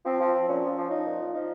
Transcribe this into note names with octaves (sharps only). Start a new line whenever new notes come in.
F3 C4
F3
F3
A#2 C#4
F3
F3
F3 D#4
A#2
F3
F3 D#4